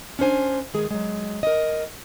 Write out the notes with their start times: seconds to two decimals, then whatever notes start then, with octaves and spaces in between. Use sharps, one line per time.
0.19 C#4 D4 C5 G#5
0.74 D#3 G#3 G#4
0.91 F#3 G#3
1.43 A#4 D#5